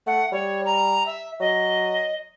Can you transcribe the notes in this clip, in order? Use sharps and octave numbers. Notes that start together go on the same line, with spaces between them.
A3 F#5
G3 C#5
A#5
E5
F#3 D#5